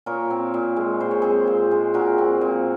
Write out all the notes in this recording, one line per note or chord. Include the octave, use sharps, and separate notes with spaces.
A#2 A#4 C#5
C4
A#2
G#3
A#2 C5
C#5
C4 G#4 C5
A#2
G#3
A#2 F#4 A#4
C4
A#2